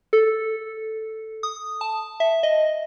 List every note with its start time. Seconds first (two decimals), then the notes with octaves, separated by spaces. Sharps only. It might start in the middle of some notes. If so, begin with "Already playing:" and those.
0.13 A4
1.43 D#6
1.81 A5
2.20 E5
2.43 D#5